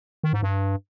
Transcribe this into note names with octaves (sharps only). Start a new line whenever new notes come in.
D#3
G#2
G2